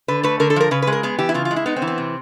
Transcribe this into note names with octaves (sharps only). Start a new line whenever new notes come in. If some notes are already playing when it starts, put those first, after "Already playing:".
D3 B4
A3 B4
D3 A#4
A4
F3 A#4
C#3 B4
B4
G#3
A#4
B3 G#4
E3 G4
E4
C#3 F4
F4
G#3
E4
B3 D#4
C4
E3
C4
C3